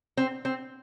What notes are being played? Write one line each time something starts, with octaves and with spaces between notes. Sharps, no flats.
C4
C4